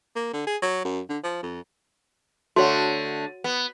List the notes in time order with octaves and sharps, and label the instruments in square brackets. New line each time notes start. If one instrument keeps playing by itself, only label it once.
[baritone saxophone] A#3
D3
G#4
F#3
F#2
D3
F3
F2
[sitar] D3 A3 [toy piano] F#4 C#5 F#5
[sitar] B3